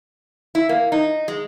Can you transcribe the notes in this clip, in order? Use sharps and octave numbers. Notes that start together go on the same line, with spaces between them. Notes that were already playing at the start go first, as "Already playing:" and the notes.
E4
A#3
D#4
G#3